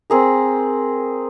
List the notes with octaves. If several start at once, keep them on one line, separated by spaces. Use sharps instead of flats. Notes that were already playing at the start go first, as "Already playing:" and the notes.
C4 G#4 A#4